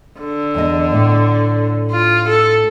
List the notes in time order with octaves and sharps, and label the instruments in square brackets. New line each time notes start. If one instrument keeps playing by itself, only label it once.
[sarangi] D3
[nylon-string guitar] E2 D#5
A2
[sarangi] F4
A4